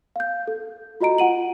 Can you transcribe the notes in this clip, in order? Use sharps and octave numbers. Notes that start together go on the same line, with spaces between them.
F5 G6
A4
F4 F#4 D#5 A#5 D7
F4 F#5 D#7 F#7